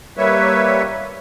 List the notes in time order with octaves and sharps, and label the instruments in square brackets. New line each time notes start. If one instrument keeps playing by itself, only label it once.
[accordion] G3 A#3 B4 C#5 E5